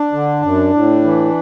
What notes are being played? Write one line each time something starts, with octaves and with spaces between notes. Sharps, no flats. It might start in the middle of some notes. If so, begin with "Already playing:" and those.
Already playing: D4
D3
F#2
A2
E3